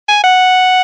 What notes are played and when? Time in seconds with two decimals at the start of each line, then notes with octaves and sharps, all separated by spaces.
0.09 G#5
0.24 F#5